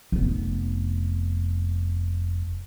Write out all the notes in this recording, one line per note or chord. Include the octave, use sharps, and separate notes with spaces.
F1 B3